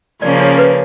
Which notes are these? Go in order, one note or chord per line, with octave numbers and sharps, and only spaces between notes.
C#3 F3 A#3 C#4 D5
C#5
B4